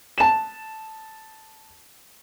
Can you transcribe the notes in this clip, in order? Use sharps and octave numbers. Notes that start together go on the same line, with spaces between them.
A5 E7